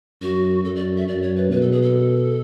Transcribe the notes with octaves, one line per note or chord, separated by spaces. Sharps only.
F#2 F#4
F#2 A4
D5
E5
F#2 D5
C#5
B4
B2 B4
A4
G#4
A4